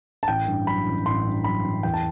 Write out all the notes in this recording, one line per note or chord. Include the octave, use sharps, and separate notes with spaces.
A5
A1 G5
G2
F#3 B5
A1
A1 C6
G2
F#3 B5
A1
E2 G5
A5